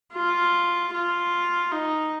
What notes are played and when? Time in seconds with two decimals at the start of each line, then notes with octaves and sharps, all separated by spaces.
0.13 F4
0.93 F4
1.72 D#4